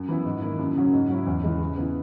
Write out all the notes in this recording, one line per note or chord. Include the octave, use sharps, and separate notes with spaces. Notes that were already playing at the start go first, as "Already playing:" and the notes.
Already playing: F#2
E3 B3 E4
G#2
D#3 A#3 E4
F#2
C#3 F#3 C#4
G#2
F#3 C#4 E4
E2
C#3 E3 G#3
C#3
E3 B3